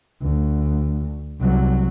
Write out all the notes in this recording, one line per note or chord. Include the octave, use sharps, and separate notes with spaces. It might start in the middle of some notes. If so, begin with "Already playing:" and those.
D2
C2 F#3